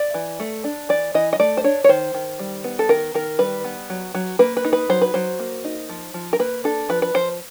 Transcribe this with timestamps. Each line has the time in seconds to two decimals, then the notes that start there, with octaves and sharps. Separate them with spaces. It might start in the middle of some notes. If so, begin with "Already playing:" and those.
Already playing: D5
0.14 E3
0.40 A3
0.64 D4
0.89 E3 D5
1.14 E3 D#5
1.33 D#5
1.40 A3 D5
1.57 C5
1.64 D4 C#5
1.84 C#5
1.89 D#3 C5
2.14 D#3
2.39 G3
2.64 B3
2.79 A4
2.89 D#3 A#4
3.14 D#3 A#4
3.39 G3 B4
3.64 B3
3.90 F#3
4.15 F#3
4.39 A#3 B4
4.57 B4
4.64 D#4
4.73 B4
4.89 F#3 C5
5.02 B4
5.14 F#3 C5
5.39 A#3
5.64 D#4
5.89 F3
6.14 F3
6.33 A#4
6.39 A#3 B4
6.64 D4 A4
6.89 F3 B4
7.02 B4
7.14 F3 C5